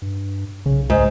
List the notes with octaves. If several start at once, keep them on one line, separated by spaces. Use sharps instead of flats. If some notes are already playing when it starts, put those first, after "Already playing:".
G2
B1 C#3
C#2 G#2